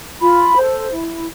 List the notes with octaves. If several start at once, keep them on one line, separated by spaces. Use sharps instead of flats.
F4 B5
A4 C5
E4